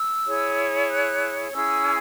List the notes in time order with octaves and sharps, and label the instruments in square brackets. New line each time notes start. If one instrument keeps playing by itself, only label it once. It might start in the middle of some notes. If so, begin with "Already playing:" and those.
Already playing: [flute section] E6
E4 G#4 C#5
F#6
C#4 E4 G#4 E6